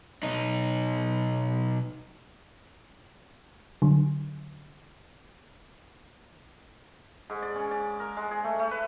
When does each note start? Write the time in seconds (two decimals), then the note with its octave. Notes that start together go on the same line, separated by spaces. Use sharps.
0.23 B1 D#4
3.82 D3 F#3
7.30 G#2
7.42 D5
7.55 C#4
7.71 D5
8.00 A#4
8.17 G#3
8.31 G#4
8.44 A3
8.59 A3
8.71 B4